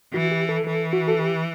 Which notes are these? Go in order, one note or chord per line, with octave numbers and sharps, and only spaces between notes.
E3 F#4
G4
A4
E3 A4
F#4
A4
G4